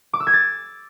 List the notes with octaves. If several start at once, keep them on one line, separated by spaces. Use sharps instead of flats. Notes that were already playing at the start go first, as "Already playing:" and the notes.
D6
E6
G#6
A6